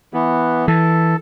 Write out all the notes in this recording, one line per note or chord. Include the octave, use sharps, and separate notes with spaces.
E3 B3
E3 A4